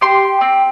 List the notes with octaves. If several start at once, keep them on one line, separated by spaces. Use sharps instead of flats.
G4 C6
C4